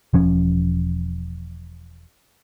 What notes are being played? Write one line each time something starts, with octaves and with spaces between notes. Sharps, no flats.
E1 F3 C#4